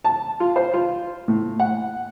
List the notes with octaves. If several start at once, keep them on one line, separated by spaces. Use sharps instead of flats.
A5
F4
C5
F4
A2
F#5